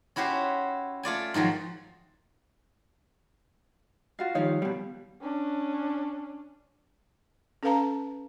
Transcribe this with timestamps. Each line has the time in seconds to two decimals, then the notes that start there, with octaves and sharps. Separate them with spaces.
0.16 C#4 E4 F#4 G4 C5
1.03 A3 F4 D5 G#5
1.34 G#2 D#3 F3 F#3
4.19 F4 F#4 F5
4.35 D#3 F3 G3 C#5 F5
4.62 B2 G3
5.21 C#4 D4
7.63 C#4 A4 B4 F5 A5 A#5